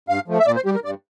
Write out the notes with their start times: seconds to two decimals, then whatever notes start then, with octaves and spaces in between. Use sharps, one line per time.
0.09 G2 F5
0.28 F3 A3
0.39 E5
0.46 A#2 D5
0.56 C5
0.66 G3 G4
0.75 A#4
0.84 G2 D5